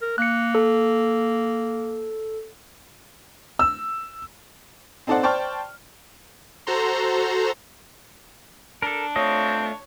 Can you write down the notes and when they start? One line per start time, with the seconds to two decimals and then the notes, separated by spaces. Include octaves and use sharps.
0.02 A#4
0.18 A#3 F#6 C#7
0.55 A4
3.59 E6
5.07 C4 D#4 A4 C5 D5 F#5
5.23 C5 D5 G5 A5 C#6 F6
6.67 F#4 A4 C5 A#5 C6
8.82 D4 A4 A#4
9.16 A3 C4 F4 C#5 D#5